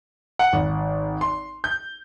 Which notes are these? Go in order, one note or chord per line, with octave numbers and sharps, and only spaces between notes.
F#5
G#1
C6
G6